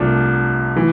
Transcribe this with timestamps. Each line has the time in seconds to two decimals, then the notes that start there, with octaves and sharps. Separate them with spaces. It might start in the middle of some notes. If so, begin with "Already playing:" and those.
Already playing: C2 C3 F3 A3 D4
0.76 E3